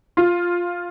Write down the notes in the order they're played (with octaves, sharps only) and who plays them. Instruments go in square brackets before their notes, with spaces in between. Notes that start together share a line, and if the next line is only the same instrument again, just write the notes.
[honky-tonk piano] F4